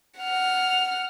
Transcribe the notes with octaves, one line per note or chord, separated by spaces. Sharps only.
F#5 F6